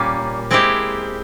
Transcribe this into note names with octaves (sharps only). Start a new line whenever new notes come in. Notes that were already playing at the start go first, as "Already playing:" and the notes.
Already playing: A#2 G3 A#3 C#4
G#3 C4 E4 G4